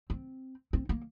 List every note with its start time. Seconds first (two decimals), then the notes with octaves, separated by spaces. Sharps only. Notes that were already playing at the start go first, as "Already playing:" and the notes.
0.10 C4
0.73 C4
0.89 A#3